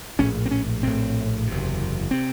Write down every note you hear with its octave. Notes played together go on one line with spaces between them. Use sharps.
A#1 A2 C#4
C4
C#4
A#1 A2 C4
F#1 E2 C3
C3 C4